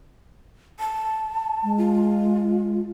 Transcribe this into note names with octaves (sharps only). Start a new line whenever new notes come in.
A5
G#3
F4